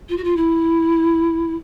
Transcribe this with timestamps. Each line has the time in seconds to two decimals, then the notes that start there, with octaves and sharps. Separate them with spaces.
0.09 F4
0.17 F#4
0.24 F4
0.36 E4